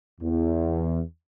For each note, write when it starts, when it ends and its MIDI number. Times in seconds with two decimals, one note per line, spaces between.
0.21 1.00 40